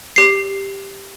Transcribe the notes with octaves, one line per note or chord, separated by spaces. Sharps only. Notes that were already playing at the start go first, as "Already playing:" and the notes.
G4 C7